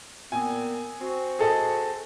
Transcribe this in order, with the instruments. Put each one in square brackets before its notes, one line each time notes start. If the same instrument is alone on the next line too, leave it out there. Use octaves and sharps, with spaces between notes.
[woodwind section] A#2 B3 C4 [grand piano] G#5
[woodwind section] C4 F#4
[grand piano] G#4 A4 D#5